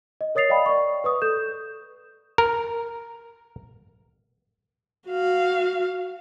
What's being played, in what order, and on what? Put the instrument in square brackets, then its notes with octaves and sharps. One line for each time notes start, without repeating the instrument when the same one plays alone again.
[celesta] D#5
A#4 C#5 D#6 A6 C7 F7
D5 D#5 F5 G5 B5
D5 C#6
B4 C#6 D#6
A4 G6 E7
[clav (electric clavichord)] A#4
[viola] F#4 F5